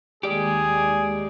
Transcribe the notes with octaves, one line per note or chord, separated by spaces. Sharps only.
D#2 G#3 G4 G#4 D5